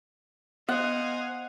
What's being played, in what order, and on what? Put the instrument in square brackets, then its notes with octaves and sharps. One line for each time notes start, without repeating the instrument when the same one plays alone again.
[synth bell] B3 [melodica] C5 D#5 [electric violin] F5 G#5 [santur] F#5